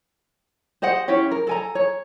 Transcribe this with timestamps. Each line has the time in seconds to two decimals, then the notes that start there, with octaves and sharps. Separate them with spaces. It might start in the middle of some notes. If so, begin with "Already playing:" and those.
0.82 G4 C5 D#5 F#5
1.08 C#4 E4 G4 C#5
1.31 A#4
1.47 A4 G#5 A#5
1.75 C#5